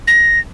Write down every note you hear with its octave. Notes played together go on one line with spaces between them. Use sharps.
A#6